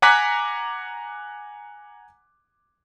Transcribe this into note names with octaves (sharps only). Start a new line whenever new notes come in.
F#5 G#5 A#5 D6 F#6 B6